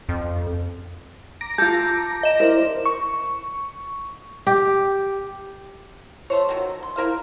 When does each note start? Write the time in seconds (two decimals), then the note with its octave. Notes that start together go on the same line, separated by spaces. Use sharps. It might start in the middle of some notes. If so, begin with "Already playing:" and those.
0.09 F2
1.41 A#5 D6 A#6
1.58 F4 A4 G6
2.23 D#5 E7
2.40 E4 A#4 C5 D5
2.85 C#6
4.47 G4
6.30 A3 C5 C#5
6.49 D#3 F#3
6.83 C6
6.96 E4 A#4 C5 F5